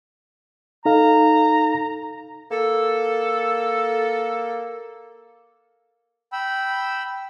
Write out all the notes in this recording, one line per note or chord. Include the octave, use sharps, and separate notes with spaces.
D#4 A4 F5 A#5
A#3 A4
G5 B5 E6